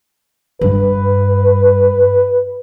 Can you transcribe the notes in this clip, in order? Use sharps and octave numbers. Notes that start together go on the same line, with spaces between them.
G2 B4